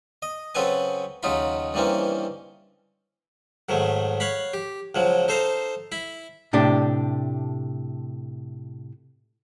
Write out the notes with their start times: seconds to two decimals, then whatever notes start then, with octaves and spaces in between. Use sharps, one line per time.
0.22 D#5
0.55 C#3 F#3 C4 A4 B4 G#5
1.23 D#2 C#3 F#3 D#4 F4 B5
1.74 G2 D#3 E3 A#3 C4 C#4
3.69 G#2 D#3 F#3 A3
4.20 C#5 F5 F#5 B5
4.54 G4
4.95 C#2 F3 F#3
5.28 D#4 A4 C5 F5 A#5
5.92 E4 B5
6.53 A2 C3 D4 G4